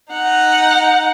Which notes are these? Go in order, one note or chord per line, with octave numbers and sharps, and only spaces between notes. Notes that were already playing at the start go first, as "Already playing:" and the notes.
D#4 F#5